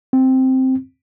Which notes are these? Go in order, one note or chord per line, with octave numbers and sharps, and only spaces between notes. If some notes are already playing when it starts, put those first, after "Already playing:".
C4